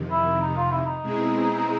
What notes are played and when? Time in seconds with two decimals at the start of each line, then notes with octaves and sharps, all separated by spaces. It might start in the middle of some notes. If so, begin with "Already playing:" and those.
Already playing: F2 C3 D#3
0.10 E4
0.42 D#4
0.57 F4
0.72 E4
0.86 D#4
1.02 B2 G#3 C4 E4 G#4